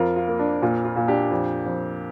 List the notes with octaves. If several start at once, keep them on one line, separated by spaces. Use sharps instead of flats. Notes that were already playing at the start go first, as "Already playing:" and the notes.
Already playing: F2 F4 A#4
F4
A#3
D4
A#2 F4
F4
A#2
D4 G4
F2
F2